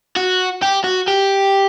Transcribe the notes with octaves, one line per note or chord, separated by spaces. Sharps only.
F#4
G4
F#4
G4